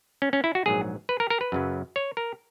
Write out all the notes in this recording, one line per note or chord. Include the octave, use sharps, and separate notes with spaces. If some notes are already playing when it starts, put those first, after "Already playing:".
C#4
C#4
E4
F#4
A#1 G#2 F#3 G#4
B4
A#4
A#4
B4
F#2 C#3 F#3
C#5
A#4